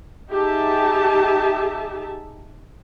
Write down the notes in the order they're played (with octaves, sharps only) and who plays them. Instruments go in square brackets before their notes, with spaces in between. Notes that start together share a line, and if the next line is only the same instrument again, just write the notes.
[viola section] D#4 G4 G#4 E5 A5